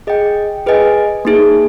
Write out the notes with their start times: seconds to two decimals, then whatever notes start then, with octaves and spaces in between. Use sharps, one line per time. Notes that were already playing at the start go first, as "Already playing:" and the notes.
0.07 G#4 D#5 G5
0.66 G#4 B4 D#5 G#5
1.25 A#3 D#4 G#4